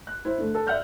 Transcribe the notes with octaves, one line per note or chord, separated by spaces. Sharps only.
F#6
E4 C5
D3 A3
A4
D5 E5 F#5 F6 G6